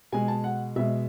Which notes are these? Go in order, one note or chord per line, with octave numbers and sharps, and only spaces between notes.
B2 G#3 G#5
A5
F#5
B2 G#3 E5